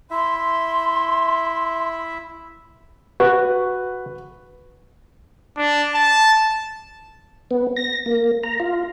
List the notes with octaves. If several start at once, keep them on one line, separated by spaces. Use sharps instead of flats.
E4 E5 C6
F#4 B4
D4
A5
B3
A#6
A#3
A#5
F4